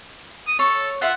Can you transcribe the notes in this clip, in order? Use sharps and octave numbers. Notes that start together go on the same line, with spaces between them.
D#6
A4 C#5
F4 E5 F#5